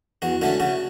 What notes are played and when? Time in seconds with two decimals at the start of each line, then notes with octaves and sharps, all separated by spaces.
0.22 E2 F#4
0.41 D3 A3 C#4 F#4
0.60 C#3 F#4